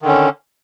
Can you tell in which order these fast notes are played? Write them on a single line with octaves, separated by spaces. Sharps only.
D#3 D3 C#4